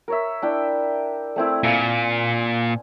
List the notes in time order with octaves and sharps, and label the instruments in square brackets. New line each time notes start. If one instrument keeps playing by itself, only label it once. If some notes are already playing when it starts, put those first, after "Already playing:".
[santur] A#4 C#5 E5
D4 E4 G5
A3 C4 E4
[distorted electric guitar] A#2 [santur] F5 G#5